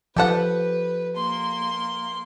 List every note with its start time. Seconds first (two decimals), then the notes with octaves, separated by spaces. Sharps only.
0.16 F3 G4 A4 B4 F#5
1.16 A#3 C6